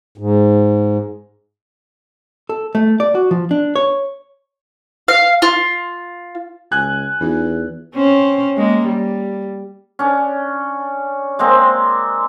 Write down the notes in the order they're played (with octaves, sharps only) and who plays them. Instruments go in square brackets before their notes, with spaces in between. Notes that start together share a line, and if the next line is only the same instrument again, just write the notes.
[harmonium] G#2
[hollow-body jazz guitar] A4
A3
D5
F#4
F3
D4
C#5
[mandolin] F5
F4
[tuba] C#2 [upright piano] G#5 F#6 G#6
[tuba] E2 [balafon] C#4 D#4 F4
[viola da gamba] C4 C#4 C5
G#3 A#3
G3
[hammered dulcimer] C#4 D4
G#3 A#3 C4